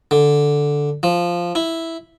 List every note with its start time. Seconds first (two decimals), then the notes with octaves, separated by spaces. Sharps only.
0.11 D3
1.03 F3
1.55 E4